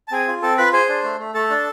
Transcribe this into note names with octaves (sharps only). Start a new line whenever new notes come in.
A5
C4 G#4 G#5
F4
C4 A4 A5
F4 B4 B5
G#4 C5 C6
D4
A3
A3
A3 A4 A5
D4